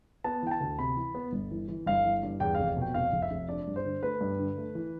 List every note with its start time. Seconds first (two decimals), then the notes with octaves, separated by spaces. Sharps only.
0.24 B3 A5
0.43 E3 G5
0.51 A5
0.60 D2
0.79 C3 B5
0.96 E3
1.15 B3
1.32 G1
1.51 E3
1.68 E3
1.86 G1 F5
2.05 E3
2.23 G2
2.40 E2 G5
2.55 F1 F5
2.77 B2 G5
2.94 F1 F5
3.13 F1
3.22 E5
3.31 F1
3.49 D4 D5
3.67 G2
3.76 C5
3.85 D3
4.03 A3 B4
4.21 G2
4.39 D3
4.58 A3
4.75 E3